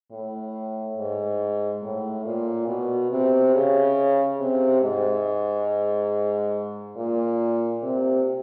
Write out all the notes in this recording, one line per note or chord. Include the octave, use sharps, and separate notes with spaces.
A2
G#2
A2
A#2
B2
C3
C#3
C3
G#2
A#2
C3